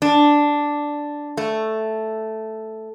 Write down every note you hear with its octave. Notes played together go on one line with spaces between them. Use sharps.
D4
A3